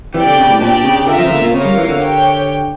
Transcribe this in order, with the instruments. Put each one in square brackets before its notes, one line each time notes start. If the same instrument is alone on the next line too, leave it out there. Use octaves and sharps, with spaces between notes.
[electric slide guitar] E3 [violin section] G4 D5 G5
[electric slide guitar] D3
C#3
A2
[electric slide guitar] A#2 [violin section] D4 G4 D5 G5
[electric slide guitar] C#3
[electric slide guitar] D3 [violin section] F4 A#4 E5
[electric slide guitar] F3
C#3
D3
A2
A#2
[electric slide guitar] C#3 [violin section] F4 A#4 C#5 F5
[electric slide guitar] G3
E3
D3
[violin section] G4 C#5 G5